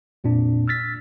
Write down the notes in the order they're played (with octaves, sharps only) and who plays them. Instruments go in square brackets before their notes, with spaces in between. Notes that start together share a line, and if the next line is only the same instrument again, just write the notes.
[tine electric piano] F2 A#2 C4 D4
E6 F6 A6 B6